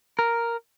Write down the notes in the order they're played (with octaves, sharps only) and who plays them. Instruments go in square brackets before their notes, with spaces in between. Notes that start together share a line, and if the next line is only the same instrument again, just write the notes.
[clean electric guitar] A#4